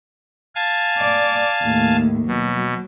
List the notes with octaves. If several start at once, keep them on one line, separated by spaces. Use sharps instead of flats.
F5 G#5 A5
D5
D#2 A2
B2 F#3